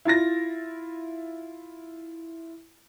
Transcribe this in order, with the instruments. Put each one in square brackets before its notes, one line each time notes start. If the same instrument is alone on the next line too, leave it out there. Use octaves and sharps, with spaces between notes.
[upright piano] E4 F4 A6 A#6